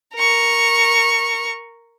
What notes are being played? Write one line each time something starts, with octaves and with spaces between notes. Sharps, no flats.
A#4 C#6